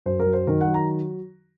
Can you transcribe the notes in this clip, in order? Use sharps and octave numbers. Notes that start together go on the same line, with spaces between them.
F#2 C5
A#4
F#3
C5
D#3 A#4
F#5
F#3
A#5